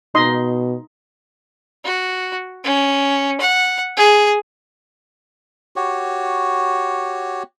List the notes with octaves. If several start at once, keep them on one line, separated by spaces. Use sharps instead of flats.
B2 D#4 D#5 C6
F#4
C#4
F#5
G#4
F#4 G4 C#5